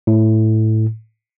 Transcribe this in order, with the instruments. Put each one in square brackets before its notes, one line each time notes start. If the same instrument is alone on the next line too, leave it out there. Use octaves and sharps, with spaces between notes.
[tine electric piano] A2